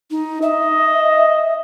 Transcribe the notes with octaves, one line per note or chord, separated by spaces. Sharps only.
D#4
D#5 E5